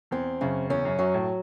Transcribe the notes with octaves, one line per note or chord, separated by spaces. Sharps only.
E2 C4
F#2 C#3
E2 C#4
F#2
F#2 F#3
A2